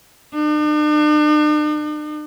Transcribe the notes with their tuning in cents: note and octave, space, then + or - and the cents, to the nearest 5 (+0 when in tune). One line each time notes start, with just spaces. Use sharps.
D4 +45